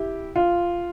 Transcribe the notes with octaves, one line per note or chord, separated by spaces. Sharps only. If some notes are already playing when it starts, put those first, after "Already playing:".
Already playing: E4 G4
F4